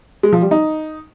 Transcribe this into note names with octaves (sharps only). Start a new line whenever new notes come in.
G#3
F3
G3
D#4